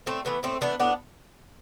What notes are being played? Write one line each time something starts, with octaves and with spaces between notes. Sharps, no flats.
A2 A3 C4
E3 A3 B3
A2 A3 C4
E3 A3 B3 D4
A2 B3 D4